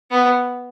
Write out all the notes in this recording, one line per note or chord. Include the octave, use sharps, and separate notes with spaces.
B3